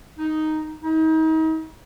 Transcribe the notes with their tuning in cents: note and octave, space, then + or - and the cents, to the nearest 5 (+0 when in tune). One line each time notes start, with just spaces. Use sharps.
D#4 +0
D#4 +35